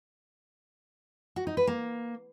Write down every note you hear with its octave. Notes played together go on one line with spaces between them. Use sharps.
F#4
D#4
B4
A#3